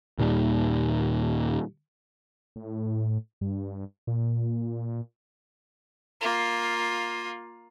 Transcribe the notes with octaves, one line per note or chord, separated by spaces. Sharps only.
D#2 A#2 D#3 G3
A2
G2
A#2
A#3 F4